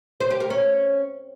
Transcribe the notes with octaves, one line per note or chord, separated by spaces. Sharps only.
C5
G4
A#4
C#4